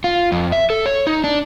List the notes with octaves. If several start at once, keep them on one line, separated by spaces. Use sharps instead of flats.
F4
F2
E5
A4
C#5
D#4
D4